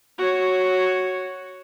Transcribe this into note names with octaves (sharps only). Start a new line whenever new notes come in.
F#4 C#5